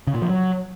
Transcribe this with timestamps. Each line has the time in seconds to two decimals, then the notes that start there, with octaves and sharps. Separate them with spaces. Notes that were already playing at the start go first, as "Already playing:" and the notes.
0.07 C#3
0.15 A#2
0.22 F3
0.29 F#3